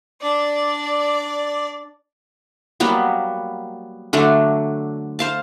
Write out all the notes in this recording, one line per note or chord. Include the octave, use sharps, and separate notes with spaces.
D4 D5
F#3 G3 A#3 B3
D3 F#3 A3 D4
C5 F5 A5